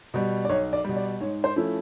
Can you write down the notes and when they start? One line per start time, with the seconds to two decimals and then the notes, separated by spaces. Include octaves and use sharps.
0.14 B2 G3
0.45 D5
0.49 B1 C#5
0.73 D5
0.84 B2 G3
0.96 D5
1.20 G#2 C#5
1.44 C5
1.56 F3 A3 C#4 E4